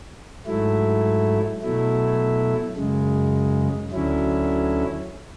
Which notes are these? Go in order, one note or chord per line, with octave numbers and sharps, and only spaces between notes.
G#2 F#3 A3 E4
B2 F#3 A3 E4
F#2 C#3 G#3
D2 D3 F#3 C#4 E4